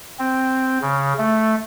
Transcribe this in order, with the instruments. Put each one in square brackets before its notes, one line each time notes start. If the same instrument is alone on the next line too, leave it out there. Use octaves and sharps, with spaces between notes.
[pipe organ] C4
C#3
A3